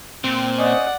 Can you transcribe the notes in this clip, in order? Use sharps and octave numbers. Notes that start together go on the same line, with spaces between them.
A#2 C4
C#4 C5 D5 D#5 F#5